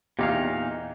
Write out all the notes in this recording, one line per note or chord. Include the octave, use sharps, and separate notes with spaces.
E2 A#2 D#4 G4 F5